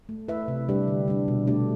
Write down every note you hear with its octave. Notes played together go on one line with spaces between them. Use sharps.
A3
E4 B4 E5
C3
G3 D4 G4 B4
D3
G3 D4
B2
A3 D4 G4 D5